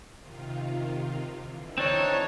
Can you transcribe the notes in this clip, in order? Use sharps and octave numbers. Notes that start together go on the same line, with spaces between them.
C3 D#3 F4
D3 E3
C4 D4 D#4 C#5